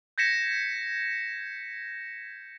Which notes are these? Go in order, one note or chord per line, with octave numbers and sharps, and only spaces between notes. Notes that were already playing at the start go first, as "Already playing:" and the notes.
G6 G#6 A#6 B6 C#7 E7